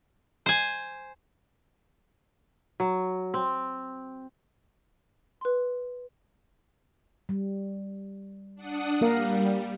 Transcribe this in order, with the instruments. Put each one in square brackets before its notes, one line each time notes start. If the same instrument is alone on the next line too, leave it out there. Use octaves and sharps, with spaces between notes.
[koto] C5 G#5
[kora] F#3
C4
[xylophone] B4 C6
[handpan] G3
[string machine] D4 F#5 D#6
[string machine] G3 [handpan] A#3 A#4 F5